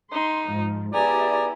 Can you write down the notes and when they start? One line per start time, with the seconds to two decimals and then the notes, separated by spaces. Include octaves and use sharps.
0.13 D#4 C6
0.47 G#2 F3
0.93 B3 E4 G4 G#4 D5 G#5 A#5